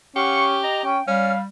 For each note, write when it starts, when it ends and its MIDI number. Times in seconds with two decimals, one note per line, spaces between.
0.16 0.60 61
0.16 0.89 67
0.16 0.45 77
0.16 0.45 78
0.16 0.45 85
0.63 0.84 75
0.63 0.84 82
0.85 0.99 61
0.85 1.01 79
1.08 1.44 55
1.08 1.34 61
1.08 1.39 77